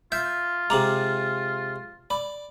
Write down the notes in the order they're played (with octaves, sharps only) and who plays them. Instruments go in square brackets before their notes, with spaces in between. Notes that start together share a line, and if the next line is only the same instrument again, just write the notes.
[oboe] F4 [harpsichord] E5 [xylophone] G6
[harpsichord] C3 G#3 [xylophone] A#5 D6 F#7
[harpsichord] D5 [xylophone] B5